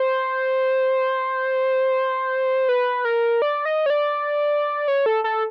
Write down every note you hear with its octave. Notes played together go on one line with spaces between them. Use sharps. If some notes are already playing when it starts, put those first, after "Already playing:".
Already playing: C5
B4
A#4
D5
D#5
C#5
D5
C#5
A4
A4